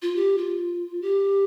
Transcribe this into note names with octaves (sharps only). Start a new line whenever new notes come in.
F4
G4
F4
G4